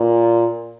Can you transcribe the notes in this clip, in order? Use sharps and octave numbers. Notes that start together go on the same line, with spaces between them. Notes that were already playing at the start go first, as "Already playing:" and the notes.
Already playing: A#2